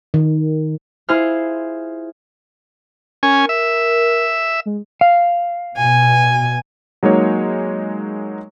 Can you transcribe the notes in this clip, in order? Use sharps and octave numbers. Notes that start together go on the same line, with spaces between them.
D#3
E4 F4 G#4 C5 F6
C#4 A#4 G#5
E5
G#3
F5
B2 G#5
F#3 G#3 A#3 D#4 C#5